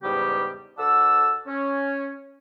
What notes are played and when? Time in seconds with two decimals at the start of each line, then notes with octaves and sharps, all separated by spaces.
0.03 E2 G#2 C#3 G3 B3 G4
0.79 D2 A4 D5 F#5 A5 E6
1.47 C#4